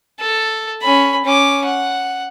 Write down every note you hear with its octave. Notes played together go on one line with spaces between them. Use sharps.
A4
C#4 B5
C#4 D6
F#5